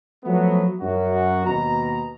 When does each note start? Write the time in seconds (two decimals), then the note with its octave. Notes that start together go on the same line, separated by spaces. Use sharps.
0.24 F3 F#3 A3 B3
0.81 F#2 F#4
1.46 D#2 B2 A#5